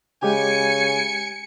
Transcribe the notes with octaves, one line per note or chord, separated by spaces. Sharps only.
C#3 G#3 G4 G#5 C#7